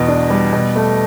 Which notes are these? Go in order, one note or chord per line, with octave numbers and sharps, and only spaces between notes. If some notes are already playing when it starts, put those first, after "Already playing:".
Already playing: E2 B2
D4
G3
B2
A3